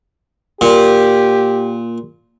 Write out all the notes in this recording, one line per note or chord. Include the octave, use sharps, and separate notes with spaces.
A#2 G4